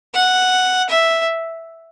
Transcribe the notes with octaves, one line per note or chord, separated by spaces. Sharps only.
F#5
E5